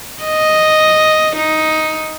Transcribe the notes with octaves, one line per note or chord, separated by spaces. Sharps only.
D#5
D#4